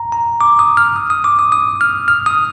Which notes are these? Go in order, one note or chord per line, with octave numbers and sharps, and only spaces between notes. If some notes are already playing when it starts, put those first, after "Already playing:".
Already playing: A#5
A#5
D6
D#6
F6
D#6
D#6
D6
D#6
D#6
F6
F6
D#6